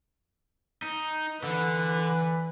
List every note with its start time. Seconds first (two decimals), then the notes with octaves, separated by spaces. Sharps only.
0.82 D#4
1.43 D3 E3 B4